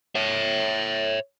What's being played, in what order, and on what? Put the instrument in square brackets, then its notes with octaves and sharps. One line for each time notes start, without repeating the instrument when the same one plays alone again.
[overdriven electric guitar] C#5 E5